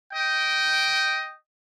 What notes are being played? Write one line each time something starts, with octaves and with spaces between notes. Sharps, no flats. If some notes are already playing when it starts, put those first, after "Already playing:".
D#5 G5